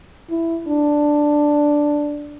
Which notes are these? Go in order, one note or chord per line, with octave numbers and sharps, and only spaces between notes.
E4
D4